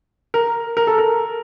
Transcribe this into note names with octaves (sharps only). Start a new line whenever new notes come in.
A#4
A#4
A4
A#4